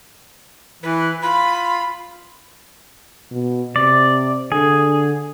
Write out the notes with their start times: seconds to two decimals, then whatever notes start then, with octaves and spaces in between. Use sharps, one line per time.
0.83 E3 B4
1.22 F4 B5
3.31 B2
3.76 C3 D5
4.52 D3 G#4